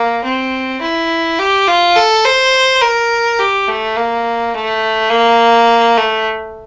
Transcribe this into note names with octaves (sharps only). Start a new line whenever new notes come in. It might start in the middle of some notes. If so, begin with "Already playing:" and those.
Already playing: A#3
C4
E4
G4
F4
A4
C5
A#4
G4
A3
A#3
A3
A#3
A3